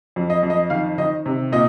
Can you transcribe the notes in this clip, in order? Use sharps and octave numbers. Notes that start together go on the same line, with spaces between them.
F2
D#5
F2
D#5
D#3 F5
D#3 D#5
C3
A#2 D#5